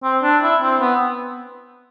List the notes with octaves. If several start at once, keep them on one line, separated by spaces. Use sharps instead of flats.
C4
D4
E4
C4
B3